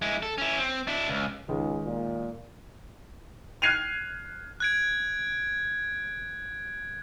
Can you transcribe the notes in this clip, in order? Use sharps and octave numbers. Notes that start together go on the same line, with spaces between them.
G#3 E4
A4
C#4 E4
C4
D4 E4
C#2
C#2 D#3 G#3
A#2
F6 F#6 G#6 C7 D#7 F7
F#6 G#6 D7